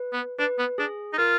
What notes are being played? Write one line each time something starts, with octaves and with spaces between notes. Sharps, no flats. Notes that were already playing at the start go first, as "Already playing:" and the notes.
Already playing: B4
B3
D4 B4
B3
D4 G#4
D#4
F4 A#4